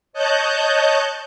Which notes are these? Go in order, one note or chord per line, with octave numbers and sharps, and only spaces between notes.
C#5 D#5 A5 F#6 G6